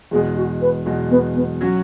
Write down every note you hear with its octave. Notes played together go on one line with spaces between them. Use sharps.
E2 B2 G#3 G#4
F#4
B4
E2 B2 G#3
B3
B3
F#3 C#4 F#4